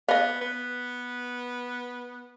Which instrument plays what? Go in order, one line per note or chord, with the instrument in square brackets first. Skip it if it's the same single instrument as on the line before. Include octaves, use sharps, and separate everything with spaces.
[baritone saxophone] B3 [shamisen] D#5 F5
[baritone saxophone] B3